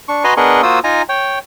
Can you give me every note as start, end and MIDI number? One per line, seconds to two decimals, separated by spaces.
0.08 0.24 62
0.08 0.24 85
0.24 0.34 66
0.24 0.34 71
0.24 0.34 75
0.24 0.34 80
0.24 0.34 82
0.24 0.34 84
0.37 0.62 59
0.37 0.62 62
0.37 0.62 68
0.37 0.62 70
0.37 0.62 75
0.37 0.62 85
0.63 0.79 58
0.63 0.79 65
0.63 0.79 66
0.63 0.79 72
0.63 0.79 87
0.63 0.79 88
0.84 1.02 63
0.84 1.02 65
0.84 1.02 80
0.84 1.02 82
1.09 1.39 73
1.09 1.39 79